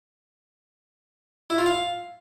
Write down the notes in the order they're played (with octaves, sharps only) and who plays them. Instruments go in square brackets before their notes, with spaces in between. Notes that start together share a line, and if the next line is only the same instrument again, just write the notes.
[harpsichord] E4
F4
F5